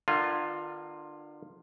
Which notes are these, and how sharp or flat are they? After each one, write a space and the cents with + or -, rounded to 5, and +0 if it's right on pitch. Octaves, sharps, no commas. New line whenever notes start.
D3 +35 A#3 +35 F4 +5